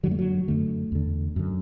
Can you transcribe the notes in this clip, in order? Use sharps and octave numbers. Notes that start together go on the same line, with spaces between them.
F#2 D3 F#3 A3
F#3
F#2 D3 A3
E2 D3
F#2 D3